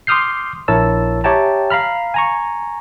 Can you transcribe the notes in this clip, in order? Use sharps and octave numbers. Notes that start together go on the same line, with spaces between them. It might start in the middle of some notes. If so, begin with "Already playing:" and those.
C6 D6 D#6 F6 G6 C7
A#1 E4 A#4 C#5 A5 E6
G4 C#5 E5 G5 A5 A#5
F5 A#5 B5 F6
G#5 A#5 C#6